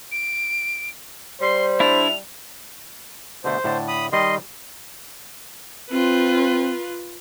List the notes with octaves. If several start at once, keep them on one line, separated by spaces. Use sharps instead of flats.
D7
G3 C5 C6
D4 E4 F7
B2 D3 A3 C5
A2 D3 A5
B5 D#6
D#3 G3 D#5 C6
C4 F4 B4